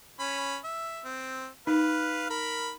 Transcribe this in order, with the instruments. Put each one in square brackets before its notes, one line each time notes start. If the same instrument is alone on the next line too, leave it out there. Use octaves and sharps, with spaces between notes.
[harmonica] C#4 B5
E5
C4
[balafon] D#4 [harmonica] B4 F5
[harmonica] A#4 B5